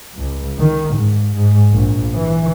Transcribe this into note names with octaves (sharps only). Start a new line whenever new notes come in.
C#2
D#3
G#2
G#2
A#1
E3